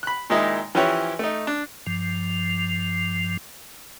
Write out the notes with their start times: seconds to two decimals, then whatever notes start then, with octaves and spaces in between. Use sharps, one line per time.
0.03 B5 F#6
0.30 A#2 D#3 G#3 D#4 E4
0.75 E3 F3 C#4 E4 G4 C#5
1.19 A3 D#4
1.47 D4
1.86 G2 F3